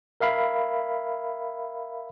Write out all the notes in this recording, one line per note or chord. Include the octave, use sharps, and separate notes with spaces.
A#4 E5 F5 B5